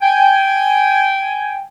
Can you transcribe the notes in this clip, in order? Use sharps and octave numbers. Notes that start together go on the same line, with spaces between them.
G5 G#5